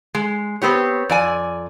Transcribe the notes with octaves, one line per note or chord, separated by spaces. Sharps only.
G#3
B3 C4 G4 C#5
F2 D5 G#5